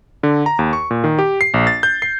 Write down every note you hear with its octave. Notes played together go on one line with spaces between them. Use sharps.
D3
A#5
D#2
C#6
A#2
D#3
G4
C7
A#1
A6
G6
C7